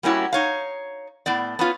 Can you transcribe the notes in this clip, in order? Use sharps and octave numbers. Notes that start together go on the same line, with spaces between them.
G3 A#3 C#4 E4 F#4
D#4 C#5 F5
A2 B3 D5
B3 C#4 F4